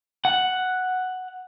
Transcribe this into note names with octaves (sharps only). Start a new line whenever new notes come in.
F#5